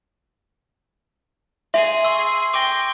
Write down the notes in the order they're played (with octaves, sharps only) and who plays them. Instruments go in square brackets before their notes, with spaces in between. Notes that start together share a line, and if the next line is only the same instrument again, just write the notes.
[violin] G#4 [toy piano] E5 [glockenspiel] C6
[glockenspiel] C6 C#6 E6
[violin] G5 [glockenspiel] D6 A#6